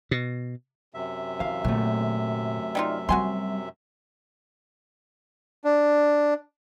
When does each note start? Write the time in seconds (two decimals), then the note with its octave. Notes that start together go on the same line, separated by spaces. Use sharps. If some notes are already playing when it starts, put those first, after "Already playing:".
0.11 B2
0.94 F#2 C3 E5
1.40 E3 F5
1.64 A#2 D3 F#3 A3
2.75 G3 D#4 F4
3.09 G3 C4 F#4 G#5 C6
5.64 D4